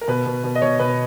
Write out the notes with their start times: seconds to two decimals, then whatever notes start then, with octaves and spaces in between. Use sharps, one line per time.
0.01 A#4
0.08 B2 B4
0.26 B2
0.44 B2
0.55 D#5
0.62 B2 C#5
0.80 B2 B4